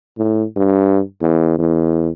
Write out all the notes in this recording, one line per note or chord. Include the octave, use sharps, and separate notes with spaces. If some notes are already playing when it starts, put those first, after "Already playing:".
A2
G2
E2
E2